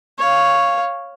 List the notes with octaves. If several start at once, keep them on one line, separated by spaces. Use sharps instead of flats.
C#5 F5